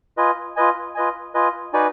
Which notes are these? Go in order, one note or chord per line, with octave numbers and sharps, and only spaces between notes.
F4 B4 D#5 G#5
F4 B4 D#5 G#5
F4 B4 D#5 G#5
F4 B4 D#5 G#5
D#4 F#4 B4 D5 G#5